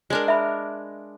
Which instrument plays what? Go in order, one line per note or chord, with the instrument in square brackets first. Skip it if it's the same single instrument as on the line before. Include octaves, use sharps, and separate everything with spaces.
[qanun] G#3 D4 A#4
[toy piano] E5 B5